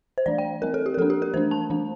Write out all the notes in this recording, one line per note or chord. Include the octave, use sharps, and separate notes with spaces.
C5
E3 A3 D4 D5
G5
G3 C4 A#4
A4
G4
A#4
F3 A#3 D4 A4
G4
A#4
E3 A3 D4 C5
A5
E3 A3 D4